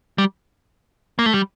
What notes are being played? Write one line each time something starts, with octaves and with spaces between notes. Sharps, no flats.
G3
A#3
A3
G3